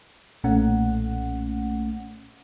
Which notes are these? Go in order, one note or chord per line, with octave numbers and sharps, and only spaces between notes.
B1 A#2 A3 C#4 F#5